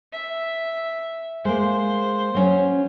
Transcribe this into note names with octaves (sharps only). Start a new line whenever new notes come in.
E5
G#3 A#3 C5
F#3 C#4 C#5